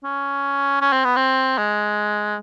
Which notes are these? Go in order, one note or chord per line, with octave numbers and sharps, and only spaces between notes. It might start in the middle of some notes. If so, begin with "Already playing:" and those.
C#4
C#4
C4
B3
C4
G#3